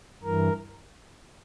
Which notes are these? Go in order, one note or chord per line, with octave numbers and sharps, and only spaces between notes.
G2 E3 A#4